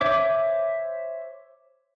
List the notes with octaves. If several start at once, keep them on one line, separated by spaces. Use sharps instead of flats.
C5 C#5 E5 D6